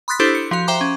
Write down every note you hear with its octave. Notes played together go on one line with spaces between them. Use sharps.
B5 C6 D#6 F#6 A6 B6
D4 E4 G4 A4 C5 C6
C#7
F3 F#4 F5
C5 E5 G5 A#5 C6 D6
C#4